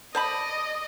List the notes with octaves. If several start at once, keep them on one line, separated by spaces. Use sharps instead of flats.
C5 D5 D#5 A5 B5